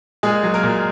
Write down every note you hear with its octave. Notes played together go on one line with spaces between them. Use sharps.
A#2 G#3 G#4
F#3
A#3 A#4
A#2